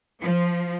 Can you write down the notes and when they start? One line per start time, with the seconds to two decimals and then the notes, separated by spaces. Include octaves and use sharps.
0.21 F3